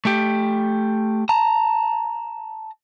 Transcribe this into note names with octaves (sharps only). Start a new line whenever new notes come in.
A3 G4
A5 A#5